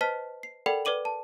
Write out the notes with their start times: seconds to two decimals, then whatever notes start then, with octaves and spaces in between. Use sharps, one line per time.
0.01 B4 C5 D#5 A5 F6 B6
0.43 C7
0.66 A4 A#4 D5 F#5 G5 B5
0.85 B4 D5 D6 D#7 F#7
1.05 A5